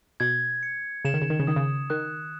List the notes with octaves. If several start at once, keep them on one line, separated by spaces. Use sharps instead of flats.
B2 G#6
C#7
C#3 E7
D#3
C#3
D#3
C#3
D#3 D#6
C#3
D#3 F#6